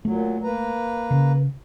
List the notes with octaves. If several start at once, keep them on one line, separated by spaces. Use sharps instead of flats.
A#2 F#3 A3
A#3 B4 A#5
C#3